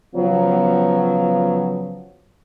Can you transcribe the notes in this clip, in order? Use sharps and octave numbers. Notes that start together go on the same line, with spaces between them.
C#3 F3 F#3 B3